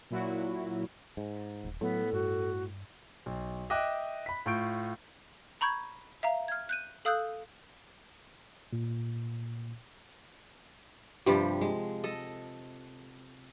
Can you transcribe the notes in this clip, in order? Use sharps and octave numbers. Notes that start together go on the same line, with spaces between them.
A#2 F#3 E4 F#4
G#2
D#1
A2 F#3 B3 A4
G2 F#4
B1
D#5 E5 G5 D6 F#6
B5 B6
A2 F4 C#6 G6 D7
A#5 B5 C#6 G6 G#6
E5 F5 A#5
F6 G#6
F#6 G6 D#7
A4 F5 D#6 E6 F#6 G6
A#2
G2 C3 F3 G3
G#3
A4 D#5